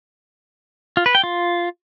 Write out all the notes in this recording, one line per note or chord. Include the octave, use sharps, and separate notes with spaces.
F4
B4
G5
F4